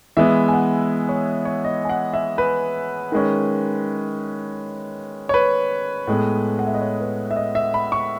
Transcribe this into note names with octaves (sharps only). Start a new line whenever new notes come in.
E3 G#3 B3 E5
G#5
F#5
C#5
C#5
D#5
G#5
F#5
E5
B4
D#3 G#3 C#4
C#5
B4
A2 G#3 B3
F#5
E5
D#5
C#5
B4
E5
D#5
E5
B5
C#6